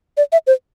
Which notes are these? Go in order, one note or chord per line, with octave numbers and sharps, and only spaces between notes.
D5
E5
C5